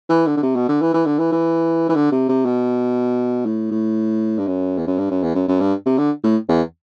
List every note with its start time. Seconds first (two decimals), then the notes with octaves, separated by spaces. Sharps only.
0.09 E3
0.26 D3
0.37 D3
0.43 C3
0.55 B2
0.68 D3
0.81 E3
0.94 E3
1.06 D3
1.19 E3
1.32 E3
1.89 E3
1.95 D3
2.11 C3
2.29 C3
2.45 B2
3.46 A2
3.71 A2
4.38 G2
4.47 F#2
4.77 E2
4.87 F#2
4.98 G2
5.10 F#2
5.23 E2
5.35 F#2
5.48 F#2
5.60 G2
5.86 C3
5.98 D3
6.23 A2
6.48 E2